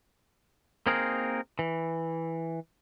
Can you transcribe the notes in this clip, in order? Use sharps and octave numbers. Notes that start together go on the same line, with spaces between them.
A#3 C4 D#4 G#4 A#4
E3